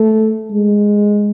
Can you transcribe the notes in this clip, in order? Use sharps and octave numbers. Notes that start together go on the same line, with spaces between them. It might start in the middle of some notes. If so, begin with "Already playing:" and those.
Already playing: A3
G#3